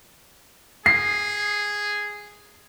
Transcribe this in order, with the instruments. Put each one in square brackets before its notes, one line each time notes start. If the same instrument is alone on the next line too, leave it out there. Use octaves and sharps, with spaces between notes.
[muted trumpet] G#4 [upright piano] C7